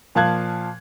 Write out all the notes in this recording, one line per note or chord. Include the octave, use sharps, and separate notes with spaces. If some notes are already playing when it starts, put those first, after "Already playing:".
A#2 F3 F5 A5 F#6 G#6